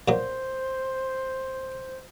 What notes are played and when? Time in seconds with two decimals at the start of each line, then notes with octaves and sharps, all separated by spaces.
0.08 A#2 F#3 C5